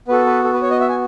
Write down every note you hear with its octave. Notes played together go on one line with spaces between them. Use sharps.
B3 F#4 A4 B4
B4
A4
B4
C#5
D#5
E5
G#5